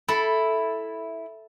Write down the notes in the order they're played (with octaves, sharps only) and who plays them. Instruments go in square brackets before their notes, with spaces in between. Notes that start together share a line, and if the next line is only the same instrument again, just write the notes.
[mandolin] E4 [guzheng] A4